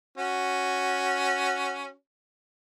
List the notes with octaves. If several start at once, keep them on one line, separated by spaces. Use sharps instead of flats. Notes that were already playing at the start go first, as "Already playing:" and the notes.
C#4 F#4